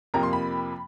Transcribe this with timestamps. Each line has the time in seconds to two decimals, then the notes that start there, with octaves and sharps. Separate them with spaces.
0.14 F2 C3 F3 A#3 A#5
0.23 C6
0.33 B5